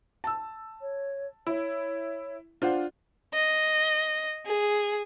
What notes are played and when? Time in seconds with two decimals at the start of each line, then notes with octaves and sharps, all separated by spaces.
0.24 A5 E6
0.81 C#5
1.47 E4 C#5
2.62 D4 F4 C5 F5 F#5
3.34 D#5
4.47 G#4